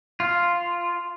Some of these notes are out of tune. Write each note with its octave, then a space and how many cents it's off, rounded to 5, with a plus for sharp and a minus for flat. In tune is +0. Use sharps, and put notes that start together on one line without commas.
F4 -5